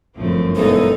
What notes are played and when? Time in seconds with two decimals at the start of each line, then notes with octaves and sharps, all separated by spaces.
0.16 G1 F#2 F3 A3 C4
0.57 E1 E3 D#4 A4